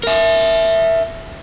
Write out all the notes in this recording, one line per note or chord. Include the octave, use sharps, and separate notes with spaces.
A#4 E5